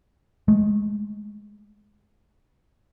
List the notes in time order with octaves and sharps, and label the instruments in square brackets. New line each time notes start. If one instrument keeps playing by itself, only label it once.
[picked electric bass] G#3 A3